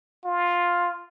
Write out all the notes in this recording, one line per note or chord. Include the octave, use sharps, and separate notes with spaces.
F4